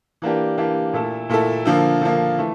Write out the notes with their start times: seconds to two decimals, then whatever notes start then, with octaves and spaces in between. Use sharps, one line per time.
0.22 E3 A#3 D4 G4
0.58 E3 A#3 D4 G4
0.93 A#2 A3 E4 A4
1.29 A#2 A3 E4 A4
1.65 D3 F3 A#3
2.01 D3 F3 A#3
2.38 E3 A3